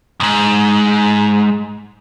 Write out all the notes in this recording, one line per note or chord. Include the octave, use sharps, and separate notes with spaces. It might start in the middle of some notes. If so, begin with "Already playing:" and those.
F2 G#2